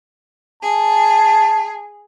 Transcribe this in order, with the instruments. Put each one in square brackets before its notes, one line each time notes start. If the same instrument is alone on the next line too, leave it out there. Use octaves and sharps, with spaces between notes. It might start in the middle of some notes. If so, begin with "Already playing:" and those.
[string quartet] G#4 [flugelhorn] A5